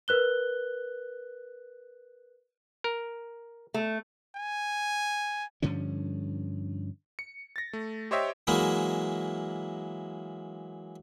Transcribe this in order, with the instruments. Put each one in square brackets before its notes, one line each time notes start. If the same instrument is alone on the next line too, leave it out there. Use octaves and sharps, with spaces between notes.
[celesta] A#4 B4 F#6 G7
[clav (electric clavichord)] A#4
[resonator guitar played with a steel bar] A3
[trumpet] G#5
[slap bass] G2 D3 F3 C#4
[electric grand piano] C#7
A6 A#6
A3
G4 C5 C#5 D#5 E5 G5
[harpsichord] E3 F#3 G#3 A#3 E4